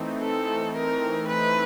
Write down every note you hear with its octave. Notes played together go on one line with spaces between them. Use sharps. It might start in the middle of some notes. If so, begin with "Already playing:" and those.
Already playing: E3 A3 C4 D#4
A4
A#4
B4